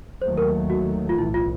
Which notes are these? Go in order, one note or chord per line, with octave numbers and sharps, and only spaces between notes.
D#2 D#3 F#3 A3 C5
A#4
F#4
F4
B1 A2 E3 E4
F4